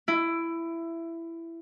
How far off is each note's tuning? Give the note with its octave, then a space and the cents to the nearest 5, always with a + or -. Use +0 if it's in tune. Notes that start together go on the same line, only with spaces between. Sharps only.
E4 +15